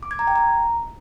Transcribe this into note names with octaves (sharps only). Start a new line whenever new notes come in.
D6
G#6
A#5
G5
A#5